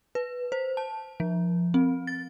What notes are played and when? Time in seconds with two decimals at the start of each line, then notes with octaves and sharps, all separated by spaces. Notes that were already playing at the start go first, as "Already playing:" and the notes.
0.15 B4
0.52 C5
0.77 A5
1.20 F3
1.74 C4
2.07 A6